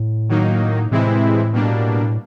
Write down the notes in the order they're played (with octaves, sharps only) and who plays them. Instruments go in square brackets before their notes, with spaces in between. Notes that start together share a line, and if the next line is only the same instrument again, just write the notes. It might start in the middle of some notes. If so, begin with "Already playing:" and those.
Already playing: [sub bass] A2
[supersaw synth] D#3 F#3 A#3 D#4
[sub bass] A2 [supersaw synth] C3 E3 G#3 C4 E4
[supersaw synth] B2 G3 A#3 D4